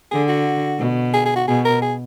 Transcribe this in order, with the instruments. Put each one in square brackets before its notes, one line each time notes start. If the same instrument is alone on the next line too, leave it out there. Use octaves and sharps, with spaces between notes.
[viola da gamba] D3 [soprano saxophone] G#4
[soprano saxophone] F#4
[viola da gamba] B2
[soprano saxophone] G#4
G#4
F#4
[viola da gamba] B2 [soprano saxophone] G#4
[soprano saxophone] A#4
G#4